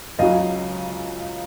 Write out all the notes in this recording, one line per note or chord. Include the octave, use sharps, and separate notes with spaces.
C#2 C#3 F#3 D#5 F5